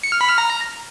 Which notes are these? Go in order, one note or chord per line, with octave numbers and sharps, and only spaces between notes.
C#7
F6
B5
F6
A#5